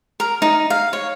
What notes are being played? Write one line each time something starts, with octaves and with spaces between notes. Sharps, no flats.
A#4
D#4
F5
C#5